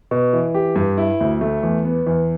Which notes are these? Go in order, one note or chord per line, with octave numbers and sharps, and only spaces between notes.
B2
E3
G4
G2
E4
D2
A3
E2
B3
E2